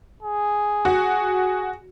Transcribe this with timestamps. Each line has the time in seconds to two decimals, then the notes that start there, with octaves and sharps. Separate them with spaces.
0.23 G#4
0.85 F#4